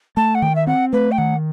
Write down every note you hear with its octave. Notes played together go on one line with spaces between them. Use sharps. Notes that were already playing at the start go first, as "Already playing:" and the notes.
A3 A5
F#5
D#3 G5
E5
C4 F#5
A3 B4
G5
D#3 F#5